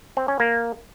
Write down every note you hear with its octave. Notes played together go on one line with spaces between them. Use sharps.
C4
C#4
A#3